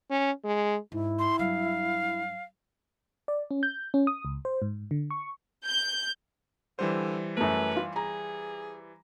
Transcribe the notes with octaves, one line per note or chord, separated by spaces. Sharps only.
C#4
G#3
G#2 E4
C6
G2 F#3 F5
D5
C#4
G6
C#4
D#6
C#2
C5
G#2
D3
C#6
G6
D3 E3 G3 C5
F#2 A3 B4
F4
G#4 A#5